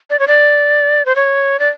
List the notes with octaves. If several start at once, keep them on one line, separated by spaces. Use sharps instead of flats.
D5
C#5
D5
C5
C#5
D5